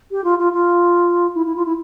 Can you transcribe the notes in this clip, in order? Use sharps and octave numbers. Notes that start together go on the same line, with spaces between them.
G4
F4
F4
F4
E4
E4
F4
E4